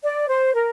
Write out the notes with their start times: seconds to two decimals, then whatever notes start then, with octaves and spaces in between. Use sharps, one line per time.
0.03 D5
0.29 C5
0.55 A#4